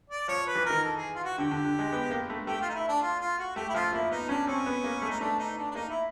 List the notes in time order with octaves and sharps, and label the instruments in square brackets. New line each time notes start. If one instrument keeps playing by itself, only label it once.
[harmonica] D5
[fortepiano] F3 [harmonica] C#5
[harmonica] B4
[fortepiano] E3
[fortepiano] D#3 [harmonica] A#4
[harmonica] A4
G#4
F4
F#4
[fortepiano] D3 [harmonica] G4
[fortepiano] D3
D3
G#3
B3
A#3
A3
[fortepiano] A3 [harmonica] G4
[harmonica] F4
D#4
E4
D4
F4
F4
F#4
[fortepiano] A3 [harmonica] G4
[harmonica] E4
[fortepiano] F3 [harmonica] F4
[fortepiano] A#3 [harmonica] E4
[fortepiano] B3 [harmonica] D#4
[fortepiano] C#4 [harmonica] D4
[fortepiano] C4 [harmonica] C#4
[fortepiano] B3
A#3
A3
[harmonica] D#4
[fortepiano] A3 [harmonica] D4
[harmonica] D#4
D4
D4
[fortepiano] A#3 [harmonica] D#4
[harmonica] E4